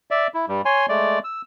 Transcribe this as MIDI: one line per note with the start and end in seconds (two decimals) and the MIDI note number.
0.11 0.27 74
0.11 0.27 76
0.34 0.46 64
0.48 0.62 43
0.48 0.62 55
0.65 0.86 73
0.65 0.86 80
0.65 0.86 84
0.89 1.19 56
0.89 1.19 57
0.89 1.19 74
1.24 1.42 88